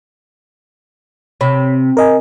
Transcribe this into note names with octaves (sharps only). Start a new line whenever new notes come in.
C3 C#5 B5
A#4 D#5 G#5